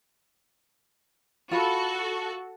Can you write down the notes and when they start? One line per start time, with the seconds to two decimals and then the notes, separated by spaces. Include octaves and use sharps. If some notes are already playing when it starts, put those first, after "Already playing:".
1.51 F4 F#4 A4 B5